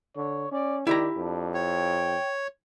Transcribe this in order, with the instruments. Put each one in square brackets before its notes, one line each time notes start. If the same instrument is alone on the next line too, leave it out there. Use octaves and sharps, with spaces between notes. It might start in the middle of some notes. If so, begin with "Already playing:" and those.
[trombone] D3 [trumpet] C#5
[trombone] C#4 [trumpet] D5
[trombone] D#3 [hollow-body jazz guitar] E4 G4 A#5 [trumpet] D5
[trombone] F2 [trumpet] D4
[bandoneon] C#5 [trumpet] G5